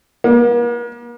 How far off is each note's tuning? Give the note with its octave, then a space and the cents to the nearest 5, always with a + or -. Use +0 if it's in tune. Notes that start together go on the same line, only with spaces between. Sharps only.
A#3 +45